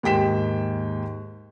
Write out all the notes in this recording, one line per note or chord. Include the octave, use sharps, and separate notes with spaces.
D#2 G#2 G5 B6 E7